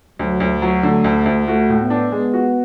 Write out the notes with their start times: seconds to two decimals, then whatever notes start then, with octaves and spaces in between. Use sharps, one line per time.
0.19 D2 F#3
0.40 D2
0.62 F#3
0.83 D3 A3
1.04 D2
1.26 D2
1.48 A3 F#4
1.70 A2
1.80 B3
1.90 D4
2.12 G#3 B3
2.34 F#4